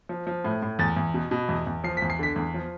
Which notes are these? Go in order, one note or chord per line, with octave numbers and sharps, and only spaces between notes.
F3
F3
A2
A2
E2 A6
E2
B2
B2
E2
E2
F3 C7
E2 B6
C7
D3 B6
E2
F3